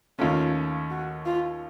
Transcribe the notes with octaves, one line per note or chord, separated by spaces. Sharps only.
D#2 C#3 A3 C#4 F4
F#4
F4